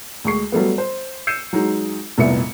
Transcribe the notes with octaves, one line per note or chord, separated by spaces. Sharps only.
D2 G#3 C#6 C7
F#3 G3 A3 B3
C5
E6 G6 C7 C#7 D#7 E7
F#3 G#3 D#4
F1 C2 A#2 B3 E5 C#7